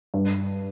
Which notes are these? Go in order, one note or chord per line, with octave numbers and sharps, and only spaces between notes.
G2